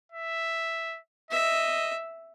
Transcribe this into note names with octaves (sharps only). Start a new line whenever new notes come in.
E5
D#5 E5